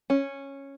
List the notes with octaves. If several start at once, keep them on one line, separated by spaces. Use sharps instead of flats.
C#4